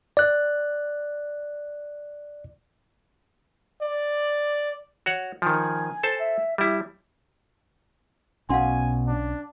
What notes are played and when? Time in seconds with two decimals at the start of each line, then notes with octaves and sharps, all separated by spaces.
0.17 D5 F#6
3.82 D5
5.06 F#4 C#5 F#5
5.42 D#3 F3 G#5
6.03 A4 C5 A5
6.19 E5
6.58 G3 E4 E5
8.49 B1 B2 C#4 F5 F#5 G#5 C6
9.07 D4